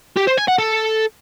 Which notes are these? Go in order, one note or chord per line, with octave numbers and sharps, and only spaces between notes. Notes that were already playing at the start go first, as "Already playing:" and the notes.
G4
C5
G#5
F#5
A4